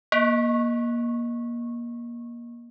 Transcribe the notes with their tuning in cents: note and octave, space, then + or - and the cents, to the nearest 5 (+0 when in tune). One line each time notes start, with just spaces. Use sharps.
A#3 +25